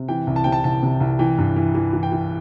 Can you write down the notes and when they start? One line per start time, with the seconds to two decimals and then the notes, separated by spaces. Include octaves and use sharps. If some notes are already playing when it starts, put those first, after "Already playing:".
Already playing: C3
0.08 E3 G5
0.27 C2
0.36 A5
0.44 C3 G5
0.52 A5
0.64 C2 A5
0.83 C3
1.00 C2
1.19 E3 G5
1.38 G2
1.56 E3
1.75 E3
1.93 E3
2.03 G5
2.12 E3